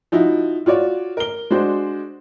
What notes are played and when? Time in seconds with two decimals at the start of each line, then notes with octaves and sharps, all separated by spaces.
0.12 F3 D#4 E4 F#4
0.66 F4 F#4 C#5 D5
1.17 A#4 G7
1.50 G#3 D4 F#4 C5